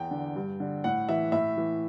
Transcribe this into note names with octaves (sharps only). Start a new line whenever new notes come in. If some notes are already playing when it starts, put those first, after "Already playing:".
Already playing: E2 G5
D3
G2
D3
A2 F#5
E3 E5
A2 E5
E3